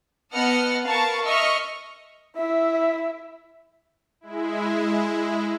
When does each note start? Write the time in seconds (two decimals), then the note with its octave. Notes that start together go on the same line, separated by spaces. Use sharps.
0.32 B3 D#5 F#5 A5 F6 C#7
0.85 A#4 B4 F5 A5 C#6
1.24 D#5 E5 C#6 F6
2.37 E4 E5
4.21 G#3 E4